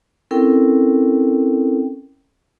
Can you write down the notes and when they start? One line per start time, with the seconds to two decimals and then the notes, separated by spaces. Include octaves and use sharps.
0.31 C4 C#4 E4 A4 A#4 G5